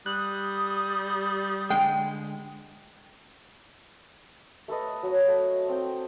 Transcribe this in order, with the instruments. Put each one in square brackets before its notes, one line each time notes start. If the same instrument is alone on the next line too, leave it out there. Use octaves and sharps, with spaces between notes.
[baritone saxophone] G3 [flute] D#6 [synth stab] F#6
[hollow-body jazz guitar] D3 G#3 [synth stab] G5
[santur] A3 A4 B4 D#5
F#3 B5
A3
C4 G5